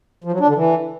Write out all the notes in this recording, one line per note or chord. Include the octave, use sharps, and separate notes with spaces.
F3
F#3
D4
D3
E3